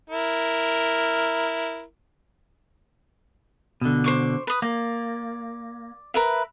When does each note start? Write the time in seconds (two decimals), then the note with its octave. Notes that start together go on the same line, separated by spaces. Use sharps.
0.10 E4 A#4
3.81 B2 D3
4.04 C5 C#6 D6
4.47 B4 D#6
4.62 A#3 D5
6.14 A#4 B4 E5